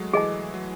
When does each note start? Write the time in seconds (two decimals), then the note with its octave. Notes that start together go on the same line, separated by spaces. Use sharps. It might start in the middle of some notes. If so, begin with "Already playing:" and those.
Already playing: F#3 G#3 A3
0.13 E3 G#4 D#5 A5
0.54 F#3